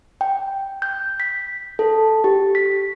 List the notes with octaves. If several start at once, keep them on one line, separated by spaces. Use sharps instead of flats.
G5
G6
B6
A4
G4
B6